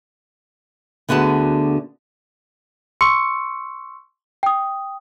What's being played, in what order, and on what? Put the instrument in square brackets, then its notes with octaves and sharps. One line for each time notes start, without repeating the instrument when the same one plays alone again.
[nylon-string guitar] D2 D3 B3 F#4 G#4 A5
[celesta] C6 C#6 E6 C#7
G5 D#6